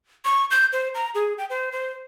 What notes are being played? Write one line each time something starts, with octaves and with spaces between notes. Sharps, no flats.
C#6
G6
C5
A#5
G#4
G5
C5
C5